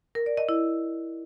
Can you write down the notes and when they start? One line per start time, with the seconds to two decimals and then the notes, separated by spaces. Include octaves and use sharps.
0.15 A#4
0.26 D5
0.37 D#5
0.49 E4